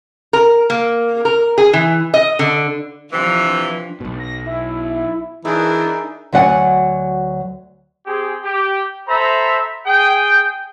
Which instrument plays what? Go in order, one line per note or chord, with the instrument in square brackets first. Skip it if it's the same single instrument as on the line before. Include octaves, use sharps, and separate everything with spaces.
[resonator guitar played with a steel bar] A#4
A#3
A#4
G#4
E3
D#5
D3
[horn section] C3 E3 [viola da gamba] F3 D4
[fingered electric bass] B1 B2
[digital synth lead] A#6
E4
[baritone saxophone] E3 [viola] D4 A#4 [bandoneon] D#4 [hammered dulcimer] G#4 E5
[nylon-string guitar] D2 F#3 D5 F#5 G#5
[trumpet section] C4 G4 G#4
G4
A4 C5 E5 A#5 B5
G#4 G5